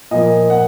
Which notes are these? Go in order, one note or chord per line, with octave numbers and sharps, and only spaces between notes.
A#2 F3 A#3 D#5
F#5